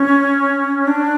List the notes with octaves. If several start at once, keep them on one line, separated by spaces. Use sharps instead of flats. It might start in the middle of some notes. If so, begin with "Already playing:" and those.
Already playing: C#4
D4